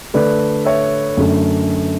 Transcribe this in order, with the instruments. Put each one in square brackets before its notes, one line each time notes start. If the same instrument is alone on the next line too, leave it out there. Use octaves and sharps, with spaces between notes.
[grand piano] D3 A3 D4 B4 D5
C#5 E5
F#2 D3 A3